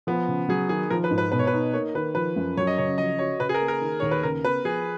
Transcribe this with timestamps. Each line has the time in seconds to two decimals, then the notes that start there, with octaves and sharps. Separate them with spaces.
0.07 F3 B3
0.28 C#3
0.49 F#3 G#4
0.69 D#3 G#4
0.90 F3 A#4
1.04 B4
1.11 G#2
1.18 B4
1.32 B2 B4
1.39 C#5
1.47 B4
1.53 D#4
1.73 A#3 C#5
1.94 D#3 B4
2.15 F3 B4
2.36 F#2
2.57 F#3 C#5
2.67 D#5
2.78 C#3 C#5
2.98 F3 D#5
3.19 F#4 C#5
3.40 C#3 B4
3.49 G#4
3.54 A#4
3.61 A#3
3.68 A#4
3.81 D#3
4.00 D#2 C#5
4.11 B4
4.23 C#3 A#4
4.44 B3 B4
4.65 F3 G#4